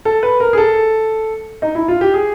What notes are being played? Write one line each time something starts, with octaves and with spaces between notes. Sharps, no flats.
A4
B4
A#4
G#4
A4
D#4
E4
F4
G4
G#4